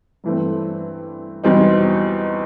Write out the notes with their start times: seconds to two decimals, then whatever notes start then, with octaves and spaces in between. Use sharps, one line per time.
0.24 G2 E3 A3 C4
1.44 E2 B2 G3 C4 D#4